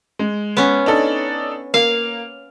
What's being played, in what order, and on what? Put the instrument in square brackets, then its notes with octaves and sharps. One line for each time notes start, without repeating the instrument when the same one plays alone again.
[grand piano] G#3
[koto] B3 C#4
[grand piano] D4 D#4 A4
[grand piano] A#3 [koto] F5